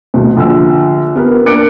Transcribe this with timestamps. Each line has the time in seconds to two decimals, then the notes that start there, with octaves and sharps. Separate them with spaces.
0.14 D2 B2
0.37 A#1 D3 E6
1.16 B3 G4 A#4
1.46 A#3 D4 D6 F#6 C#7 D7